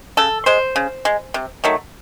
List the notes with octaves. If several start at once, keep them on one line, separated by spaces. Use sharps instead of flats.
C#3 A4
G#3 C5
C#3
G#3
C3
D#3 F#3 A3